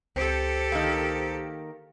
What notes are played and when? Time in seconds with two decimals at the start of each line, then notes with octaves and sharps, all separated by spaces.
0.16 C#2 C4 G4 A4 C5 C#7
0.72 D#3 A#3